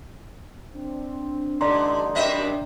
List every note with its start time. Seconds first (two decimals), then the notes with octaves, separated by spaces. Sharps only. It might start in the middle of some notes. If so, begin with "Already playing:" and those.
0.73 C4 D4
1.61 A1 G2 D3 D#4 D5 A#5 C6
2.15 F#2 D#3 C4 G4 D#5 E5